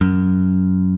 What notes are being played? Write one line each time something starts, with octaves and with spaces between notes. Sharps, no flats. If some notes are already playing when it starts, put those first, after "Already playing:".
F#2